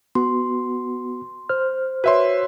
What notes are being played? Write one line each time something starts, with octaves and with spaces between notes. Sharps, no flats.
B3 F#4 C6
C5 F6
F#4 B4 C#5 E5 C6